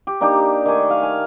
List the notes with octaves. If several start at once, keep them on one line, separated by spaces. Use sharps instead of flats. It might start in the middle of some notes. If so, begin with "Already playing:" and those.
G4
A#3 D4 D#4 G4
D#3 A3 G#5 D6
F5
G#5